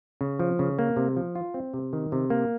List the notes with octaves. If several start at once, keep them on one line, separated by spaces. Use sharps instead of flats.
C#3
F3
C#3
A#3
C3
F3
F4
C4
C3
D#3
C3
A#3